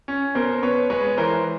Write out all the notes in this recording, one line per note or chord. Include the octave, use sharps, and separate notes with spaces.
C#4
B2 A#4 C5
B2 B4 C#5
G#3 B4 C#5
E3 A#4 C5